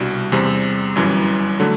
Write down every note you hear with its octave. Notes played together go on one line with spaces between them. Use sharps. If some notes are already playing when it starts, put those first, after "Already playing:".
Already playing: C2 B2 G3 D4 F#4
E2 C3 G3 C4
G1 F#2 E3 G3
D3 F#3 A3